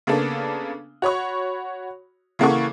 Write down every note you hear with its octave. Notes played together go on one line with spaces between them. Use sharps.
C#3 A#3 B3 D4 A4
F#4 C#5 B5 C#6
C#3 E3 A#3 A4 F#5 C#6